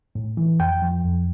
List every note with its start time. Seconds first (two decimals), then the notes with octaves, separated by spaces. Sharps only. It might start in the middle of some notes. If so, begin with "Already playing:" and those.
0.15 A2
0.37 E3
0.59 F2 G5
0.82 F3
1.04 F2